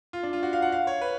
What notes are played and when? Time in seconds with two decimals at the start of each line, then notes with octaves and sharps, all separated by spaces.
0.13 F4
0.23 D4
0.33 F4
0.43 F#4
0.53 F5
0.62 F#5
0.72 F5
0.87 C#5
1.01 B4